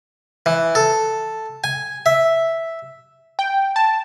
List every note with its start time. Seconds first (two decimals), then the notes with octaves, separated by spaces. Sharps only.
0.46 E3
0.75 A4
1.64 G#5
2.06 E5
3.39 G5
3.76 A5